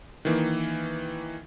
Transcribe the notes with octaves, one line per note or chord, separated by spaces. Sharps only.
D#3 E3 A#3